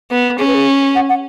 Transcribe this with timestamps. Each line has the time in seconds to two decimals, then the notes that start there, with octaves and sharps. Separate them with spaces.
0.11 B3
0.38 C#4 G#4
0.47 B4
0.54 G#4
0.95 F#5
1.09 F#5